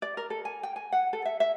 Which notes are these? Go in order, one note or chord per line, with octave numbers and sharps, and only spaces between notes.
D5
A#4
A4
G#5
G5
G#5
F#5
A4
E5
E5